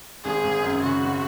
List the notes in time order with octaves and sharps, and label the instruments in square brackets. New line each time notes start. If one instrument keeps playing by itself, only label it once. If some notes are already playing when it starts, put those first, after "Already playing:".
[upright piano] G#1 [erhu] G#4
[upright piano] G#1
F#2
[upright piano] C#3 [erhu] F#4
[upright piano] G#1